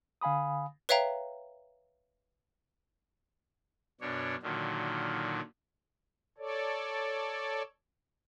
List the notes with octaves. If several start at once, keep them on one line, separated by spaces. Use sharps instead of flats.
D3 F5 G#5 B5 D#6
B4 C#5 E5 F5 G5 A#5
F#2 B2 D4 C#5
A#2 D3 D#3 F#3
A4 C#5 D5